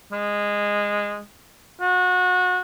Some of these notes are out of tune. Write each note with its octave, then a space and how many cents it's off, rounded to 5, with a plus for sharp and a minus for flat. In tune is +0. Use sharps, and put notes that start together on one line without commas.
G#3 -15
F#4 -30